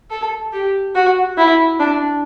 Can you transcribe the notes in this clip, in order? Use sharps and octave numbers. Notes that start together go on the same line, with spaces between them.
A4
G4
F#4
E4
D4